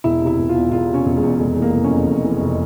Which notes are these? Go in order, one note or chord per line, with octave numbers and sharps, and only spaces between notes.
E1 E4
C3
E4
E1
F4
E2
E1 F4
C3
C#4
E1
G#3
E2
F1 G#3
E3
A#3
F1
C#4
F2
F1
E3
F1